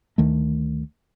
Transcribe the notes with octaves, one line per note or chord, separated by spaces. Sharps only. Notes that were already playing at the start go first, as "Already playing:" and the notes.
D2 D#3 A3